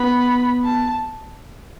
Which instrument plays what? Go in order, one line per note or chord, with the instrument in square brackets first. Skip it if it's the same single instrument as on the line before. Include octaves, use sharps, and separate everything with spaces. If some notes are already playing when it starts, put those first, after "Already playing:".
Already playing: [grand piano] B3 [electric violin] B5
[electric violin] A5